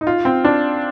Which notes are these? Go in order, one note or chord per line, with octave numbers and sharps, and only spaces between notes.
D#4
F4
C4
D4